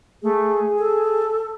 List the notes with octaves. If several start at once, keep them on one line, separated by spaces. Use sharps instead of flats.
A3 G#4
A4